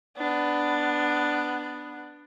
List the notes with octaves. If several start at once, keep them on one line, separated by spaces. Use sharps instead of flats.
B3 D4